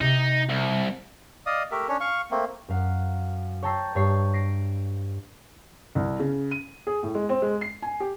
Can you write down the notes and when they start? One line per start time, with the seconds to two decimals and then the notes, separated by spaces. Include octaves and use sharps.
0.01 C3 D#4
0.49 C2
1.46 D5 D#5 F5 D#6
1.71 A3 G4 A#4 E5
1.88 C#4 D4 C#5
2.00 F5 C#6
2.31 A3 A#3 C4
2.69 F#2 F5 F#5
3.62 C#5 G5 A5 A#5 E6 C7
3.95 G2 C#5 C7
4.34 A#6 C7 D7
5.95 C2
6.19 C#3
6.51 D#7
6.87 G#4
7.03 A2
7.15 G#3
7.29 C4
7.42 G#3
7.61 C7
7.82 G#5
8.00 G4